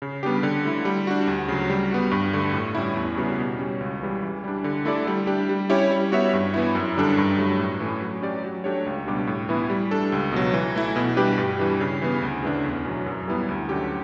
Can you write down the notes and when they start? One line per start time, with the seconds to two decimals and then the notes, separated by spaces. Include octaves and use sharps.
0.02 C#3
0.23 G3 B3 D4 G4
0.43 D3
0.65 A3 E4
0.85 G3
1.07 D4 F#4
1.27 D2
1.48 C#3 F#3
1.70 G3
1.91 B3 F#4
2.11 G2
2.33 D3 A3
2.54 A2
2.75 G3 C#4 E4
2.96 E2
3.17 C#3 G3 B3 F#4
3.39 B2
3.59 G3 C#4
3.80 C#2
4.01 C#3 E3 G3
4.22 E3
4.44 G3 D4
4.64 D3
4.85 A3 E4 A4 D5
5.07 G3
5.27 D4 G4
5.49 G3
5.70 C#4 E4 G4 C#5
5.91 G3
6.12 B3 F#4 C#5 E5
6.33 G2
6.54 E3 B3 E4
6.75 F#2
6.96 D3 G3 D4 A4
7.17 G2
7.38 F#3 A3
7.59 A2
7.80 E3 A3 C#4
8.02 F#3
8.22 C#4 G4 D5
8.44 F#3
8.64 A3 D4 G4 C#5
8.86 C#2
9.07 B2 G3 D4 G4
9.27 A2
9.49 E3 B3 E4
9.70 G3
9.91 D4 A4
10.12 C#2
10.32 B2 F#3
10.54 E3
10.76 A3 E4
10.96 B2
11.17 G3 D4 G4 B4
11.38 G2
11.59 E3 G3 D4
11.80 C#3
12.02 E3 B3
12.22 D2
12.43 C#3 E3 A3 D4
12.64 E2
12.85 B2 F#3
13.06 F#2
13.28 E3 G3 B3 E4
13.49 D2
13.69 D3 F#3 C#4 G4